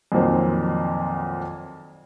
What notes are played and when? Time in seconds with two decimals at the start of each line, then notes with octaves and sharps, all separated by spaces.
0.12 F2 A#2 D#3 F#3 C4